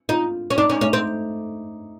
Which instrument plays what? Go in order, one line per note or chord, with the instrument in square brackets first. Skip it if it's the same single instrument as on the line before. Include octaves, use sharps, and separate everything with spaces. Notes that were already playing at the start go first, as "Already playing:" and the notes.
[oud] D#4 [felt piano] F4
[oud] C#4
[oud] D4 [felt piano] D#4
[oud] C#4
[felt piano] A3 [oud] C#4
[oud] C4